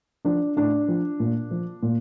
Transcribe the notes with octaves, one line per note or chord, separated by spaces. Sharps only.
F3 D4
A2 D4
F3
A#2
F3
A#2